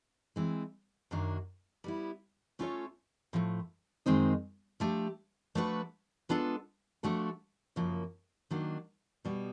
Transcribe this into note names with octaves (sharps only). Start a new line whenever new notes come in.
E3 G#3 C4
F#2 D#3 F#3 A#3 D4
G3 B3 E4
A3 C#4 F4 A4 C#5
A2 F3 A3
F#2 D#3 G#3 C4 D#4
F3 A3 D4 G4
F3 A3 D4 F#4 B4
G#3 B3 D4 F4 A4
F3 A3 D4 F#4 A4
F#2 C#3 F3 A#3
D#3 F#3 A#3 D4
B2 G3 B3